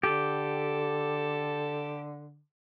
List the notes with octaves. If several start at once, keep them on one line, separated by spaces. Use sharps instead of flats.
D3 G4 A4